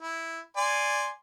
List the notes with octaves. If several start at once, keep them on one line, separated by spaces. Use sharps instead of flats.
E4
D5 G#5 C6